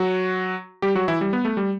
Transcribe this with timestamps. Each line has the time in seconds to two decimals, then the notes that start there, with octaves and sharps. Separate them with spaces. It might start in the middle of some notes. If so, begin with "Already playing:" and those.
Already playing: F#3 F#4
0.82 G3 G4
0.95 F#3 F#4
1.08 E3 E4
1.21 G3
1.33 B3
1.45 A3
1.57 G3